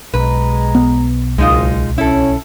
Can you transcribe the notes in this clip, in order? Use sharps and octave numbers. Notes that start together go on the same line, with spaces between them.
B1 G#3 B4 A#5
B3
F#1 C#2 G#3 D#4 F4
C#4 E4 A4